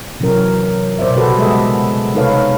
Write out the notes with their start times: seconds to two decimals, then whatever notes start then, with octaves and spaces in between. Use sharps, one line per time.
0.20 C3 E3 F#3 C#4 A#4
0.99 B2 B3 C5 D5 E5
1.16 C#3 B3 F#4 G4 A4 B4
1.38 G3 G#3 G#4 A4 D#5 E5
2.15 C3 D#4 A4 B4 C#5 F5